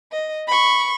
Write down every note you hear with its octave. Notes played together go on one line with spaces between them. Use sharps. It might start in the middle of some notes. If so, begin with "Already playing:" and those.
D#5
B5 C#6